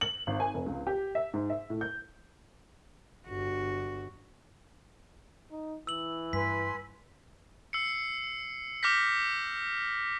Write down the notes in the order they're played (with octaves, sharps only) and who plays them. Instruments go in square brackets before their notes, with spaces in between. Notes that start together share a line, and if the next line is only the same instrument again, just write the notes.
[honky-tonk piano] F#7
G#1
G#5
F1
C#2
G4
E5
G#2
E5
A2
G6
[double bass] G1 [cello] F#4
[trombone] D#4
[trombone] E3 [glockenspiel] E6 F#7
[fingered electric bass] G2 [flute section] B4 G#5 C6 [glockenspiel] B6
[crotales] E6 C7 C#7
D6 F6 G6 A#6 B6